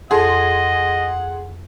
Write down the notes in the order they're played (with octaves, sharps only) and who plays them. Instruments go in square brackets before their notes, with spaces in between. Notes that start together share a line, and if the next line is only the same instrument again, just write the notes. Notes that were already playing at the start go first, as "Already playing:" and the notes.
[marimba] F2 A4 [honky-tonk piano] G#4 C6 [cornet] D#5 [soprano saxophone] F#5